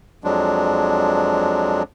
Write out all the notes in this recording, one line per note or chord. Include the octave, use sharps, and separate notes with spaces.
F2 F3 F#3 G#3 D4